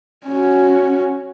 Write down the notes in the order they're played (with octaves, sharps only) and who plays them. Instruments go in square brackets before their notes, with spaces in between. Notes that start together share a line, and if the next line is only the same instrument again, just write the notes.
[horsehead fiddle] C#4 F#4